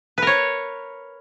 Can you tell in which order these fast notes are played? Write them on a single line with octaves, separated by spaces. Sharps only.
B4 A#4 C#5